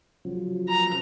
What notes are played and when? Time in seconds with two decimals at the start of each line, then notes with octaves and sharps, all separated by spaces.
0.25 C#3 F3 F#3
0.68 A#5